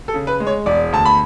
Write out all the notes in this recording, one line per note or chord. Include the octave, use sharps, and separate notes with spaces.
A4
C#3
B4
G#3
C#5
E1 D5
D2 A5
B5